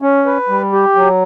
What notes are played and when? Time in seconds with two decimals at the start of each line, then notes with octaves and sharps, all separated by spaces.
0.02 C#4
0.26 B4
0.49 G3
0.72 G4
0.95 F#3